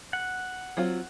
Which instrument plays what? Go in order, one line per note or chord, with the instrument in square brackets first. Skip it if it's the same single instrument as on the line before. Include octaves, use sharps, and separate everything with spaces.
[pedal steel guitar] F#5
[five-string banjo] F#3 C4 F4